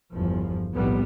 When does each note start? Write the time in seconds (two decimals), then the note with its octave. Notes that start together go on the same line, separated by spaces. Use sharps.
0.13 G1 E2 F3
0.74 F1 B1 A2 G3 B3